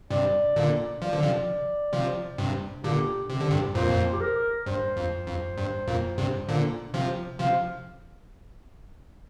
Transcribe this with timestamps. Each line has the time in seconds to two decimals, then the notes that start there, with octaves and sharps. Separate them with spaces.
0.10 G2 C3 D5
0.56 A#2 D3
1.02 F3 D5
1.13 D3
1.23 C3 F3
1.93 C3 F3
2.38 G2 C3
2.84 A#2 D3 G4
3.30 C3 G4
3.41 D3
3.51 G2 C3
3.75 F2 A#2 C5
4.13 G4
4.21 A#4
4.66 G2 C5
4.97 F2
5.27 F2
5.57 G2
5.88 F2 A#2
6.18 G2 C3
6.48 A#2 D3
6.94 C3 F3
7.39 C3 F3 F5